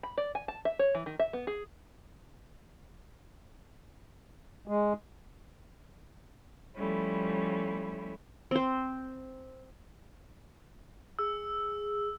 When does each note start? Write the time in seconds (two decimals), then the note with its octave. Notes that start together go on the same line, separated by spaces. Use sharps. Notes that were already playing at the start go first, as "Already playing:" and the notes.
0.03 B5
0.18 D5
0.35 G#5
0.48 A5
0.65 E5
0.79 C#5
0.95 E3
1.06 D#3
1.19 E5
1.33 B3
1.47 G#4
4.68 G#3
6.76 F3 G3 A3 C#4 E4
8.51 C4 C5
11.19 G#4 E6